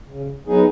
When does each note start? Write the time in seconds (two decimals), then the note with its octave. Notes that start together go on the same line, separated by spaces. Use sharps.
0.08 C#3
0.47 F#3 B3 D#4 G#4